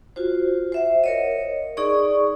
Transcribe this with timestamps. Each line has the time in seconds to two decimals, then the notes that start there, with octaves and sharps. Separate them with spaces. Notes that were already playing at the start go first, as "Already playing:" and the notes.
0.16 F4 F#4 C5
0.72 C5 E5 F#5
1.04 A#4 C#5 D#5
1.77 D#4 G#4 D5 C#6